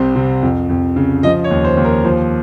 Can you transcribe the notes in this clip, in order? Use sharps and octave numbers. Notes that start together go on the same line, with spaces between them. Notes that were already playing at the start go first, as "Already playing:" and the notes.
Already playing: C2 C3 C5
C3
F2
F2
C#3
F3 D#5
C#5
D#2
C5
D#2
A#4
F3 C5